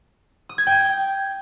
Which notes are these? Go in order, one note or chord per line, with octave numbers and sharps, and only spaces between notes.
D#6
G#6
G5